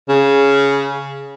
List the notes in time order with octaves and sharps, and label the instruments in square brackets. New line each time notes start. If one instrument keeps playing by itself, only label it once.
[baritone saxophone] C#3